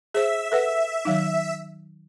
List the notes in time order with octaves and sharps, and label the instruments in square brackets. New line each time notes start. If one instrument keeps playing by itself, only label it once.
[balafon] G#4 C5 [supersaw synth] E5
[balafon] A4 B4 F#5
D#3 F#3 D#4